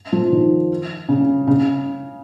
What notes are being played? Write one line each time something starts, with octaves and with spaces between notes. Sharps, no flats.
F3
D#3
C#3
C#3